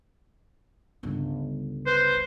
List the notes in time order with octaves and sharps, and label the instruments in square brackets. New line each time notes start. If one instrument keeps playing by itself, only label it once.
[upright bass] G1 C#2
[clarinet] B4 [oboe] C5